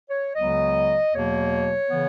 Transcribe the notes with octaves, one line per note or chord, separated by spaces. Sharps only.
C#5
C#2 C#3 F#3 B3 D#5
E2 B2 F#3 A#3 C#5
C#3 E3 B3